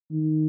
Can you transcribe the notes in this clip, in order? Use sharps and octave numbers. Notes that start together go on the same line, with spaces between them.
D#3